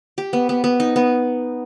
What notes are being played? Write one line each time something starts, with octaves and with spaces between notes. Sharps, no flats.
G4
B3
B3
B3
D#4
B3